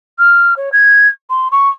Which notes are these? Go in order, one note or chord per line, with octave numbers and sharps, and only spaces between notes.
F6
C#5
G#6
C6
C#6